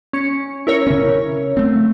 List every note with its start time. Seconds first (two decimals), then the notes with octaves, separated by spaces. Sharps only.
0.13 C#4 C#7
0.67 E4 A#4 C#5
0.87 C#3 C#4
1.57 A3 C4